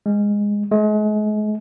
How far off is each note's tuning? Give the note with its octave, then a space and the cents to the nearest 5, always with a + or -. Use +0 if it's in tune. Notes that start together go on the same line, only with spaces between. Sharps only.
G#3 -10
G#3 +40